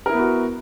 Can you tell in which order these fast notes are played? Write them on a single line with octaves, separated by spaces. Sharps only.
A#4 E4 B3 B4 F#4